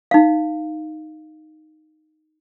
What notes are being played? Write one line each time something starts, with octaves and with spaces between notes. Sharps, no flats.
D#4 F5